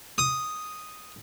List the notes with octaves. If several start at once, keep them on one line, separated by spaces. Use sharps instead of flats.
D#6